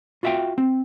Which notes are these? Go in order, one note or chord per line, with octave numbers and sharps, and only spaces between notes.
F4 F#4 E5 F5 G5
C4